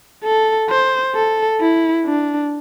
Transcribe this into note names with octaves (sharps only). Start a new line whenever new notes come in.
A4
C5
A4
E4
D4